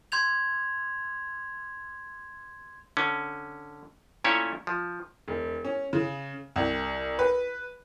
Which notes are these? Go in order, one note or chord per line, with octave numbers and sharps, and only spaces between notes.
C6 G6 G#6 F7
D3 C#4
A#2 A3 C#4 E4 C#5
F3
E1
C#4
C#3
C2
B4